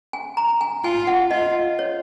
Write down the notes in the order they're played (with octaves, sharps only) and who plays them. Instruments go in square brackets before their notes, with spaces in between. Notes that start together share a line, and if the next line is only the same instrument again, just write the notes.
[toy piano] G#5
A#5
G#5
[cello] F4 [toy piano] G#5
[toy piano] F#5
[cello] F4 [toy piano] D#5
[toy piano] C#5